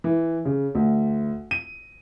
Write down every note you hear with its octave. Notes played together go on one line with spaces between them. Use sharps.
E3
C#3
D2
D#7